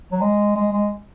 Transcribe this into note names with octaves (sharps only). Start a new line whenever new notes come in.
F#3
G#3
G#3
G#3